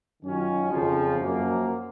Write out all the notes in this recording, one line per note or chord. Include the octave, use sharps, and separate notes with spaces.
F#2 D#3 F#3 C#4 F4
F2 C#3 F3
F#2 F3 A#3